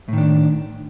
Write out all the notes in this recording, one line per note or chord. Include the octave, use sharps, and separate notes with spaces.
A2 D#3 D4